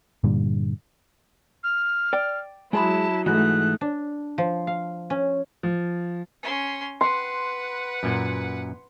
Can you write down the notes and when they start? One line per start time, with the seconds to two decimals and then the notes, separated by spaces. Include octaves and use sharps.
0.24 G2 A#2 D3 G3
1.64 F6
2.13 D5 G5
2.73 F#3 G#3 E4 G#4 A5 B5
3.26 G#2 E3 A3 D#4 F#4 F#6
3.81 D4
4.38 F3
4.67 F5
5.10 C#4
5.63 F3
6.43 C#4 C6
7.01 B4 F#5 C6
8.03 F#2 A#2